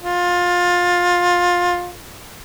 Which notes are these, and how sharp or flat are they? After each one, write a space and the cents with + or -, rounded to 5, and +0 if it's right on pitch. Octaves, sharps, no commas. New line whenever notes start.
F4 +20